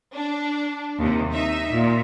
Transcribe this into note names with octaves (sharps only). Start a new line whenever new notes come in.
D4
D#2 C3
D#4 E5
A#2